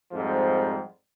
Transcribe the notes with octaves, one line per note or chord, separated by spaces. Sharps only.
F2 G#2 F3 G3